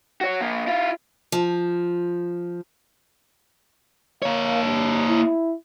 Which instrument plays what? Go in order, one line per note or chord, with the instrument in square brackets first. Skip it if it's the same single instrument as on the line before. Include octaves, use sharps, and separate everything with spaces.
[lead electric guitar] F#4 C#5
F3 A#3
E4 F4
[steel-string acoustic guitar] F3
[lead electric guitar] A#3 C#5 [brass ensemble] A#4 F5
[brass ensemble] G2
E4